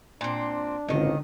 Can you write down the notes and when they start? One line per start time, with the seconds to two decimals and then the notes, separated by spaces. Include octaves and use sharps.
0.21 A#2 C4 D4
0.88 G#1 C#2 D3 D#3 D#5